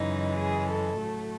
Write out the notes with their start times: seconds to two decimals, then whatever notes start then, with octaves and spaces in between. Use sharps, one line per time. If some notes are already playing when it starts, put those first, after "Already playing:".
Already playing: F#2 C#3 E3 G#3 D#4
0.40 G#4
0.70 A4
1.00 A2 F#3 A3